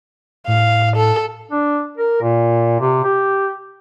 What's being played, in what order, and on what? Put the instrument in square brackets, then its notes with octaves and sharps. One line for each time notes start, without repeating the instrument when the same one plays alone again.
[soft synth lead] A2 [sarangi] F5
[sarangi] A4
[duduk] D4
A#4
A#2
C3
G4